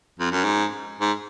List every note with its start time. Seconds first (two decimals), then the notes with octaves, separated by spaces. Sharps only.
0.19 F2
0.32 F#2
0.44 G#2
1.01 G#2